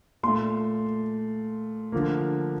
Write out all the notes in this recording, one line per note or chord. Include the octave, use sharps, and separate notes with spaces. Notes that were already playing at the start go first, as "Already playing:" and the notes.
A#2 A3 C6
D3 F3 A#3